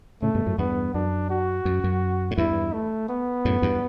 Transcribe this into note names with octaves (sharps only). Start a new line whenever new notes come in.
A2 C#3 A3
G2 B2
F#2 A2
E2 G2 B3
F#2 D4
F#4
F#2
F#2
A2
E2 G2 E4
A3
B3
F#2 A2
E2 G2